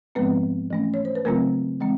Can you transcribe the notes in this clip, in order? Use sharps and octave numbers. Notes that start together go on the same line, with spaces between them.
G#2 F3 G#3 B3 C4 B4
E3 A3 C#4
C#5
C5
B4
C#3 F#3 A3 A#3 C4 F4 A#4
E3 G#3 C4